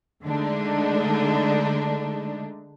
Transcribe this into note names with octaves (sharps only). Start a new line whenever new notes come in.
D3 G#3 A3 D4 D#4